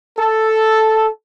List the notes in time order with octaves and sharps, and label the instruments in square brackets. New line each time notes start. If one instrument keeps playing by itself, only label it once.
[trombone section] A4